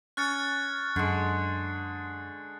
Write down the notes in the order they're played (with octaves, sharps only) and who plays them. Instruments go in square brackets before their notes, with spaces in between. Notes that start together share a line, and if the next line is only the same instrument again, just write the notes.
[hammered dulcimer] C#4 [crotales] F#6 A6 C#7
[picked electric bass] F#2 [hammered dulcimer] D3 G#3